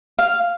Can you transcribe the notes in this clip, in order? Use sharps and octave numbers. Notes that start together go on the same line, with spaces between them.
F5